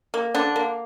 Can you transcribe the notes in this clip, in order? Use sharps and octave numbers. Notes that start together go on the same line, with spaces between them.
A#3
D3 D4
A#3